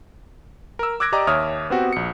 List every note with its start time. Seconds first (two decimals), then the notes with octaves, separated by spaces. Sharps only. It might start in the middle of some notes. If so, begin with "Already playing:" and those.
0.79 A#4 E6
1.00 D6 E6 F#6 G#6 A#6 D7
1.12 G4 D5 D#5 A#5 D6
1.27 D#2 C#5 E5 D#6 F6
1.70 B3 C4 F#4 G4
1.93 A#1 C#7